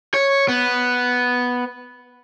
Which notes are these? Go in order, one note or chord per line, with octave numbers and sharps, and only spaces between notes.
C#5
B3